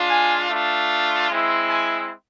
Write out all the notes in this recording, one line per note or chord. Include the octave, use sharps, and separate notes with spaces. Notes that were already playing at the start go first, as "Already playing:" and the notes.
Already playing: G#3 D4 F4
G#5
A3 D4 F4
G#3 C4 E4
G#5